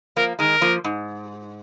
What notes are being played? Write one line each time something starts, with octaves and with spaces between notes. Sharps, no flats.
F3 A#3 A#4
D#3 G#3 A#4
F3 A#3
G#2